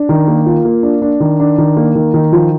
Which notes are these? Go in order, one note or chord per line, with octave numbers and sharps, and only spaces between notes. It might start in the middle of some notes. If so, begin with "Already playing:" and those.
Already playing: D4
D#3
A#3
F4
A#3
D4
D4
D#3
D4
D#3
A#3
D#3
D#3
F3